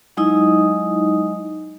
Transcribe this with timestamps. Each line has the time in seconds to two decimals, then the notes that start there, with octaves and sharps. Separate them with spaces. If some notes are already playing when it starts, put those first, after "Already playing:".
0.17 F#3 G#3 D#4 E4 D#5 D#6